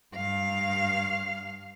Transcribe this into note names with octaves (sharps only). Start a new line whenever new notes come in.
G2 F5